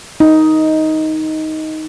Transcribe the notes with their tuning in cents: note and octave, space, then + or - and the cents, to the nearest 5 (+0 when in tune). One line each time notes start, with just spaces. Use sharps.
D#4 +10